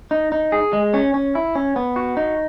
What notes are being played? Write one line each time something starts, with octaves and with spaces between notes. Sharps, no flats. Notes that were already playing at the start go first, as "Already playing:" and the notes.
D#4
D#4
G#4
G#3
C#4
C#4
E4
C#4
B3
F#4
D#4